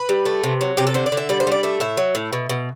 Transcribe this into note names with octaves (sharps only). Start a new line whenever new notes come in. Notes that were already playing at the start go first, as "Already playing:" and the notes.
Already playing: B4
G3
A3
C3
F#3
C3 G4
A4
D3 C5
D5
D3
E5
G3 D5
C5
G3 D5
A3 E5
A2 E5
F#3
A2
B2
B2